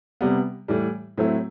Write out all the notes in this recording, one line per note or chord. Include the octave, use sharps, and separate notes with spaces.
C3 G3 B3
A2 E3 G3
A2 F#3 A3 C4 E4